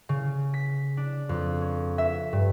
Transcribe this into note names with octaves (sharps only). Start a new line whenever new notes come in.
C#3
B6
D4
F2
C#5
E5
G2